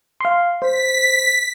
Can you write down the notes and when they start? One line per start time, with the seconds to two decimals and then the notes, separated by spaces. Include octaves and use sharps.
0.21 F5 C6
0.62 C5 B6